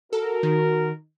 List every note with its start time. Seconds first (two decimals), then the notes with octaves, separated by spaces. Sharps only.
0.13 F#4 A4 A#4
0.43 D#3